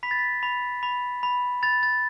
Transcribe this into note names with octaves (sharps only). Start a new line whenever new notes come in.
B5 B6
A6
B6
B5
B5
B5
B5 A6
A6